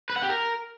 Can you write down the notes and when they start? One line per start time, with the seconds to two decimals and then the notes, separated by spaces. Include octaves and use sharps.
0.10 B4
0.16 F#5
0.23 G4
0.29 A#4